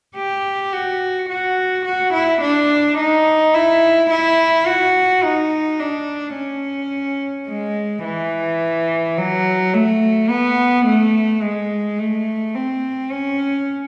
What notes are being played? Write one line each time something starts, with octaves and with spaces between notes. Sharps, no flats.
G4
F#4
F#4
F#4
E4
D4
D#4
E4
E4
F#4
D#4
D4
C#4
G#3
E3
F#3
A3
B3
A3
G#3
A3
C4
C#4